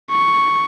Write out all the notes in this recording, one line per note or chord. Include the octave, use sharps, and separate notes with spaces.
C#6